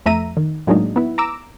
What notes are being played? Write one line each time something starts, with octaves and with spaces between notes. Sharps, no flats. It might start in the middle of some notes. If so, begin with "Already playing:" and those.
F2 A3 E5 A#5 D#7
D#3
A2 F#3 G#3 A#3 D4 D#4
B3 E4
A#5 D6 E6